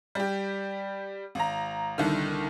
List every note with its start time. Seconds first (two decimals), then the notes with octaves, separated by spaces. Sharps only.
0.15 G3 G4
1.35 G#1 A#5
1.98 C2 D3 D#3